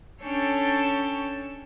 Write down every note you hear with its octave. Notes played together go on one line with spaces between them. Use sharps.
C#4 D4 A4 C#5 G5 A5